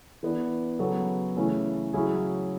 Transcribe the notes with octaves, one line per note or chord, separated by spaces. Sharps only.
E3 B3 D4
C#3 F#3 B3 F#4 A4
C#3 E3 A3 C#4
C#3 F#3 C#4 E4 G#4